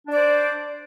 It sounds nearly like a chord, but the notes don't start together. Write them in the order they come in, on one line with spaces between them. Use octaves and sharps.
D4 D5 C5